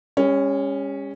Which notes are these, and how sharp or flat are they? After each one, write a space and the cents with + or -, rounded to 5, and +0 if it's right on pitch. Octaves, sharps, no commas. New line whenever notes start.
G#3 -45 C#4 +0